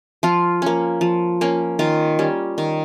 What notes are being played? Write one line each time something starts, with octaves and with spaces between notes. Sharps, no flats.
F3 F4
A#3 C#4
F3
A#3 C#4
D#3 F4
G3 C#4
D#3